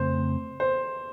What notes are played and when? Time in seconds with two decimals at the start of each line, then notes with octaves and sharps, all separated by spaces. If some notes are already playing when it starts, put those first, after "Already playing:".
Already playing: F2 C#3 A3 C4 C5
0.60 C5